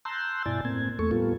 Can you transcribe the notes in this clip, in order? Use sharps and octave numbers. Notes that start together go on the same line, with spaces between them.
A5 A#5 C6 E6 F#6 G6
G2 B2 E4 D5 G#5 A6
A2 A#3 C4 G#6
E2 A3 A4 C#6
A2 G3 A#3 B3 F4 A4